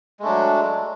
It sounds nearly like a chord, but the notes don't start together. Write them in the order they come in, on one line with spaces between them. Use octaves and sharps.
G#3 A3 D4 F#3